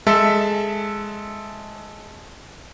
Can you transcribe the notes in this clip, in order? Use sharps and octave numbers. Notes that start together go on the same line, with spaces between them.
G#3 A4 E5